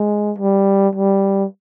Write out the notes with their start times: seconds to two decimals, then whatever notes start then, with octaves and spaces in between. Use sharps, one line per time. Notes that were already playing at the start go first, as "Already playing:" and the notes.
Already playing: G#3
0.38 G3
0.95 G3